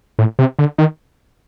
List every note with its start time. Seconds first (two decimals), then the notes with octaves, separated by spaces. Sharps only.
0.19 A2
0.39 C3
0.59 D3
0.78 D#3